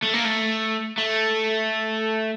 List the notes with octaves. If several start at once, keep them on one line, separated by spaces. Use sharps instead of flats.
A3
A#3
A3
A3